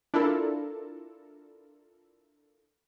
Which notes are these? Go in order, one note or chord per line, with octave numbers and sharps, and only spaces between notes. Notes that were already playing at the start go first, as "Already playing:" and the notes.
D4 E4 F4 A4 A#4